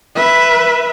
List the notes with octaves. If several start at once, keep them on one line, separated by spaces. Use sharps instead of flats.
B4 E5